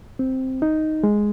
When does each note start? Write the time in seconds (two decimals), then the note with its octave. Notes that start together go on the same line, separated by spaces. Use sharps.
0.19 C4
0.62 D#4
1.04 G#3